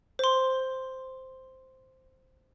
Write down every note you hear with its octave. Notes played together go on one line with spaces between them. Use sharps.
C5 C6